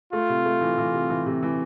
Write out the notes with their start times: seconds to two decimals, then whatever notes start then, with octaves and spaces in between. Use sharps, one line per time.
0.13 A3 F4
0.29 C3
0.46 A3
0.61 E3
0.78 E3
0.94 C3
1.10 E3
1.26 C3
1.43 E3